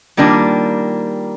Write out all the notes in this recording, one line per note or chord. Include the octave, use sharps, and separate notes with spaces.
D#3 G3 A#3 D4 F4